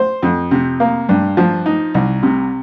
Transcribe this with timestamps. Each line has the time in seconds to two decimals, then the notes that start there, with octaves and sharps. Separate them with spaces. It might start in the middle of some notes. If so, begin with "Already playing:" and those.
Already playing: C5
0.23 F2
0.51 C3
0.80 A#3
1.09 G2
1.37 F3
1.66 D#4
1.94 C2
2.23 C3